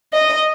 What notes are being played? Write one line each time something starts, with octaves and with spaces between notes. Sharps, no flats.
D#5